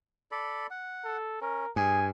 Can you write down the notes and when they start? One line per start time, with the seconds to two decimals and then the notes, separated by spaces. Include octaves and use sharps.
0.31 A4 D5 B5
0.70 F#5
1.05 A4
1.41 C#4 A#4
1.76 G2 G#4 G#5